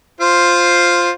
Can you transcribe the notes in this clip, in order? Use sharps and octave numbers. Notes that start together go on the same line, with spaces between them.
F4 C5